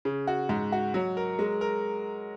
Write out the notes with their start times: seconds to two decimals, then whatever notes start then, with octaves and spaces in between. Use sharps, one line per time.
0.05 C#3
0.27 F#4
0.49 G#2
0.72 F#4
0.94 F#3
1.17 A#4
1.39 G#3
1.61 A#4